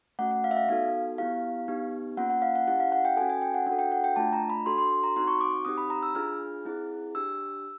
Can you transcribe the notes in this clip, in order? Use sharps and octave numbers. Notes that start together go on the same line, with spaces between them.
A3 C#4 F#4 F#5
F#5
F5
E5
F5
B3 D#4 F#4 A4 F5
B3 E4 G4 F5
B3 D#4 G4
A#3 C#4 F4 F#5
F#5
F5
F#5
C#4 E4 G4 F#5
F5
F#5
G5
C#4 F#4 A4 G#5
G#5
G5
F#5
D4 F#4 A4 F#5
G5
F#5
G5
A3 D4 F4 A5
A#5
B5
D4 F#4 A4 C6
C6
A#5
C4 D#4 F#4 C6
C#6
D6
C4 D#4 G4 D#6
B5
A#5
E6
D4 F4 G#4 F6
C4 E4 G#4
D4 G4 E6